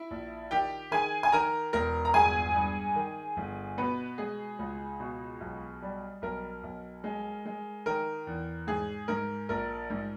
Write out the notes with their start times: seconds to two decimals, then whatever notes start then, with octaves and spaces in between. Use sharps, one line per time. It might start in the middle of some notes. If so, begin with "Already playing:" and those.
Already playing: E4 E5
0.11 A#1
0.51 D#3 G4 G5
0.91 D#3 G#4 G#5
1.23 G#5
1.32 D#3 A#4 A#5
1.73 E1 A#4 A#5
2.05 A#5
2.14 G1 G#4 G#5
2.55 G2
2.96 D#3
3.37 G1
3.78 B2 B3 B4
4.18 G#3 G#4
4.59 C#2
5.00 B2
5.41 B1
5.82 G3
6.22 B1 A#4
6.64 B1
7.04 G#3
7.46 G#3
7.86 D#3 A#4
8.27 E2
8.67 G#2 G#4
9.08 G#2 A#4
9.49 A#1 A#4
9.90 G#2